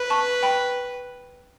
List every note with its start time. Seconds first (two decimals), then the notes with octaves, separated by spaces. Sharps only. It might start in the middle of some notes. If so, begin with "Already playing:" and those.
Already playing: B4
0.10 A5 C#6
0.43 G5 B5